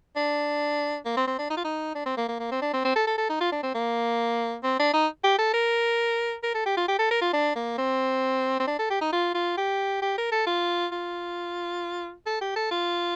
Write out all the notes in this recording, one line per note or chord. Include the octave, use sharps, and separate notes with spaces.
D4
A#3
C4
C4
D4
D#4
F4
D#4
D4
C4
A#3
A#3
A#3
C4
D4
C4
C4
A4
A4
A4
D#4
F4
D4
C4
A#3
C4
D4
D#4
G4
A4
A#4
A#4
A4
G4
F4
G4
A4
A#4
F4
D4
A#3
C4
C4
D4
A4
G4
D#4
F4
F4
G4
G4
A#4
A4
F4
F4
A4
G4
A4
F4